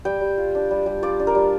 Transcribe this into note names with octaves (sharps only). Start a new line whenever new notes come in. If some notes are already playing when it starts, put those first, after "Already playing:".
G3 G5
G3
F4
D4
G3
G3
F4 D5
D4
A#4
G3